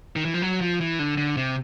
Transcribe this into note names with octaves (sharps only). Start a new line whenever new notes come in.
D#3
E3
F3
F#3
F3
E3
D3
D3
C3